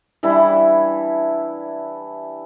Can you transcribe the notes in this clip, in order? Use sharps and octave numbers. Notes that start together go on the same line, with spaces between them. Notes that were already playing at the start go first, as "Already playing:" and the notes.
E3 G3 D4 E4